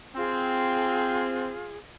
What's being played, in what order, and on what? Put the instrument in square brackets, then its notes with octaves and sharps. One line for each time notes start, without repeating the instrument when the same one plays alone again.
[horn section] C4 [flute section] F4 G#4